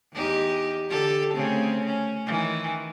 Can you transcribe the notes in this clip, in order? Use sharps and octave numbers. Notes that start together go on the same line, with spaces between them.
E2 D#4 G4
D3 G4 A4
C#3 A3 C4
C#4
D#3 E3